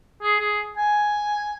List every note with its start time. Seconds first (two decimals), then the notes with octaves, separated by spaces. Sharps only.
0.23 G#4
0.40 G#4
0.77 G#5